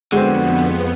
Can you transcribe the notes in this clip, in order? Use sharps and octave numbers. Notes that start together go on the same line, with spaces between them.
F2 D3 G#3 B3 C4 F#4